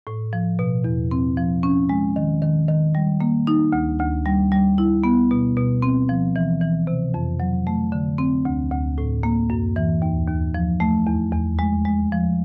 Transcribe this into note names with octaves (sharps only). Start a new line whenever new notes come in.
A2
F3
B2
E2
C4
F3
C#4
G#3
D#3
D#3
D#3
G3
A#3
D#4
D2
D2
G3
G3
E4
B3
B2
B2
C4
F3
E3
E3
C3
F2
F#3
A3
D3
C4
D2
D2
A2
A#3
F#2
E3
D#2
D#2
F3
A3
E2
E2
G#3
G#3
F3